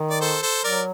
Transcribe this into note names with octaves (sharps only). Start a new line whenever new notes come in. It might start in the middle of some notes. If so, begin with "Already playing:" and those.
Already playing: D#3
D5
A4 C5
A4 C5
F#3 A#4 D5